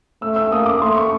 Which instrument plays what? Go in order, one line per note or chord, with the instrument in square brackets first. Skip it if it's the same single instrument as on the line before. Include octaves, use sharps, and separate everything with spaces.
[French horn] A3 [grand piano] E6
[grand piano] E6
[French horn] A#3 [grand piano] D#6
[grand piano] D6
[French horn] A3 [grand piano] C6
[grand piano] C#6